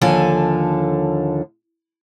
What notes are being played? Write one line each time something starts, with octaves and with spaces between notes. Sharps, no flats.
D#2 D3 F3 A4 G#5